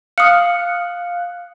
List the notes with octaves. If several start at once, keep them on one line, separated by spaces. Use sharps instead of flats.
F5 D#6 F#6 C#7